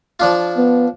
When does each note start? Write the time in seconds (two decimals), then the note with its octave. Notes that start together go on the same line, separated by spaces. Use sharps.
0.20 F3 D4 F4
0.57 B3